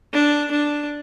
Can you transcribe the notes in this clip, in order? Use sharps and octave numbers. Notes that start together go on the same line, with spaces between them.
D4
D4